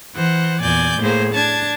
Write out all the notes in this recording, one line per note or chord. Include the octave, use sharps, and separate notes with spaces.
E3 C5 F#5
E2 A#2 D5 G#5 G6
A2 A#3 G#4 C5
D4 A5 G#6